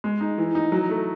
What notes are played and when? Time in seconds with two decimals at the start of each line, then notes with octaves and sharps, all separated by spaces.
0.04 G#3
0.21 D#4
0.38 E3
0.55 D#4
0.72 F#3
0.89 A3